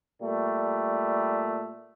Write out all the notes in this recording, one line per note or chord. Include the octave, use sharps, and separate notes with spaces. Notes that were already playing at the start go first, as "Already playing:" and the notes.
A#2 G3 A3